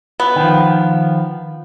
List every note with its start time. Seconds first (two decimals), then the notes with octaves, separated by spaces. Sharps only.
0.20 B3
0.36 D#3 F3